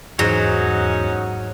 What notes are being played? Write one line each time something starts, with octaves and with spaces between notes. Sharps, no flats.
E2 G#2 F#3 C#4 D#4